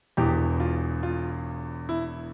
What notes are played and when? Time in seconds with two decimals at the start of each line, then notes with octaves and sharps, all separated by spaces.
0.17 E1 E2 E3 G4
0.60 F4
1.03 F4
1.89 E4